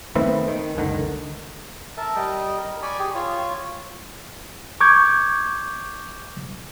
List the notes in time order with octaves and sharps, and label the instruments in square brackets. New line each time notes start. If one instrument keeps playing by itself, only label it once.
[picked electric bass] D#3 A3 B3 C4
D#3
F#1 C#2 D3 D#3
[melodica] A#4 E5 A5
G3 D#5 G5
A#4
D5 G#5 B5 C#6
G4 G#4
F4 C#5
[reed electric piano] C#6 D6 G6 G#6